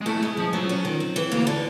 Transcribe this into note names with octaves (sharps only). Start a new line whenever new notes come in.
G#3
A3 E4
A3
G#3
F3 C#4
F3 F#3
C#4
D#3
C4
E3
D2 A#3
D3